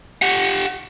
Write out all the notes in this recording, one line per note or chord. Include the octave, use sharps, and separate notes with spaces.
G4 F#5